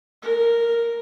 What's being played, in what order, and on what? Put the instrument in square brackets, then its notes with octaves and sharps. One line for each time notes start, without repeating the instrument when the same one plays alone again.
[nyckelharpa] A#4